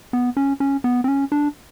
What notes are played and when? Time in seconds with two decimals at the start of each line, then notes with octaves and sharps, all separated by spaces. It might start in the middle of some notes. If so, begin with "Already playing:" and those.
0.13 B3
0.37 C#4
0.60 C#4
0.84 B3
1.04 C4
1.08 C#4
1.32 D4